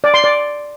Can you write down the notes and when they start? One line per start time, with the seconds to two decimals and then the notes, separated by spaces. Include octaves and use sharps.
0.04 D5
0.14 C6
0.24 D5